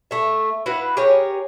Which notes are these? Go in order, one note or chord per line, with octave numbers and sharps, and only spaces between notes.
A3 E5
E4 F#4 B4 F5
G4 G#4 A#4 C#5